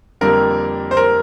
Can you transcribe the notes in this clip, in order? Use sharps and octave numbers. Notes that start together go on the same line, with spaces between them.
F2 D3 G3 A#3 A#4
C5
A#4